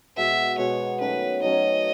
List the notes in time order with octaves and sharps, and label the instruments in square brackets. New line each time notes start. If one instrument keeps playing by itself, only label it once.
[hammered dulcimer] B2 G#3 B3 F#4 [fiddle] E5
[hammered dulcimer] B2 G#3 B3 F#4 [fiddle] C#5
[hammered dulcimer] D#3 F#3 A3 C#4 [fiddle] B4
[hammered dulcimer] D#3 F#3 A3 C#4 [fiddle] D#5